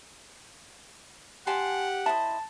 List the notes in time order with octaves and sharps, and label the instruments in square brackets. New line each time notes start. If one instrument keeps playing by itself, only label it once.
[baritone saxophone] G4 [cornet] F#5 [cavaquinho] G#5 A5 C6
[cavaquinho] E4 C5 D#5 [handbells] A5